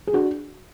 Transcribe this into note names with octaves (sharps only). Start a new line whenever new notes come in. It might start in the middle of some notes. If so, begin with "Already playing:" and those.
G#4
D4 F#4